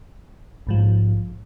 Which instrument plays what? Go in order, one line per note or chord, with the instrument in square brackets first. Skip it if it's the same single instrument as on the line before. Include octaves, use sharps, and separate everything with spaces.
[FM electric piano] A#1 G#2 F3